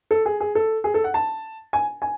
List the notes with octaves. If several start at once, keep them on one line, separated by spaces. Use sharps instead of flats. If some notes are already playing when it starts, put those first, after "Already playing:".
A4
G#4
G#4
A4
G#4
A4
F#5
A5
G#5
G#5